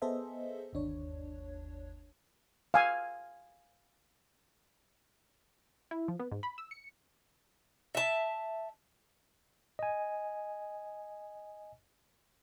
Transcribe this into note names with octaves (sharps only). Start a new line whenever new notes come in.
B3 G#4 A4 C5 D#5 E5
G1 D#2 D4 C#5
F5 G#5
E4
F3
B3
G#2
B5
E6
C#7
E5 A5
D#5 G#5